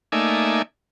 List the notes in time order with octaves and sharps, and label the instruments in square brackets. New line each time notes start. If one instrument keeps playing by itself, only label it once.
[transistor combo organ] A3 A#3 D#4 D5 E5 G#5